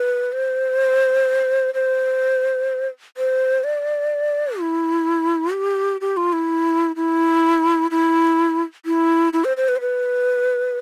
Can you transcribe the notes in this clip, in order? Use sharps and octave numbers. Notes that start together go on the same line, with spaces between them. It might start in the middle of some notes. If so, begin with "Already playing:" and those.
Already playing: B4
C5
C5
C5
D5
E4
G4
G4
F4
E4
E4
E4
E4
E4
C5
C5
B4
C5
B4